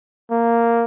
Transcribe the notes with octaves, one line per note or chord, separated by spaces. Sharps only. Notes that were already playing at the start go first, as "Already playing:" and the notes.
A#3